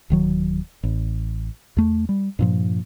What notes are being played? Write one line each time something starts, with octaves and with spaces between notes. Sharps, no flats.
D1 D#3 F#3
A1
E2 A3
G3
G2 A#2 F3